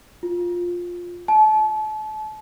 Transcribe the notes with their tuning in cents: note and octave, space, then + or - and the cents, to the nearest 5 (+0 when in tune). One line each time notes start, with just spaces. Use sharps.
F4 +10
A5 -35